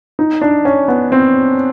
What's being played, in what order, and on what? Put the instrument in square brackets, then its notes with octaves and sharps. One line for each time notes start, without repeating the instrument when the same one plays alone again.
[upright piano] D#4
D4
C#4
B3
C4